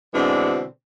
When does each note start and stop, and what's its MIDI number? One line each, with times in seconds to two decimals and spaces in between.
0.14 0.64 47
0.14 0.64 50
0.14 0.64 52
0.14 0.64 56
0.14 0.64 60
0.14 0.64 62